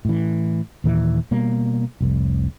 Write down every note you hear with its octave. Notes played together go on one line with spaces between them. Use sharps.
A2 E3
D#2 A#2 E3
B2 G3 A#3
F1 C2